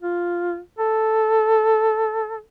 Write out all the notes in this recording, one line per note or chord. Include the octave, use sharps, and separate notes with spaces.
F4
A4